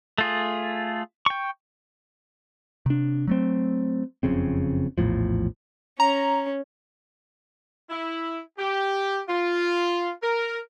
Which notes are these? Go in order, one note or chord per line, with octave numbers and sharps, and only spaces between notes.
A3 F4 G#4
G5 C#6
C3 D4
F#3 A3 C4
F#1 F2 C#3 C4
A#1 E2 A2 F3
C#4 A#5
E4
G4
F4
A#4